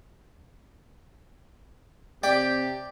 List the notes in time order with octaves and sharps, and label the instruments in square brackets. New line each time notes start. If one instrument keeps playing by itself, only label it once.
[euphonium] C3 [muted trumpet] G4 [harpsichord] D5 [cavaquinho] G5